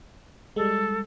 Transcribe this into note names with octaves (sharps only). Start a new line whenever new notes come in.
G3 G#3 A4